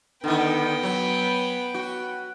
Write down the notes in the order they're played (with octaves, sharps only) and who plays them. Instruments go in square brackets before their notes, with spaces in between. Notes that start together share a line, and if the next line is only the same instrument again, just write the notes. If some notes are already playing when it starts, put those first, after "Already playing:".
[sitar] D3 D#3 [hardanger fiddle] B3 G5
[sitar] F#3
F#4